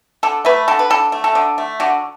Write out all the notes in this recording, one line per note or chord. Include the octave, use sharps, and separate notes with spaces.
D3 A4
A3 B4
D3 A4
B4
D3 A4
A3
A4
D3
A3
D3 F#4